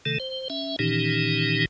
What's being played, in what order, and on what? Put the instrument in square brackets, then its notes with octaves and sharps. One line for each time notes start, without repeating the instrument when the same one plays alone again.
[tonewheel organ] C3 D#3 A3 A4
C5
C#4 E5
A#2 D#3 E3 C#4 D#4 G4